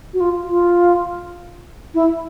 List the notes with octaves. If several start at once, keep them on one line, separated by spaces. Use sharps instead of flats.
F#4
F4
F4
E4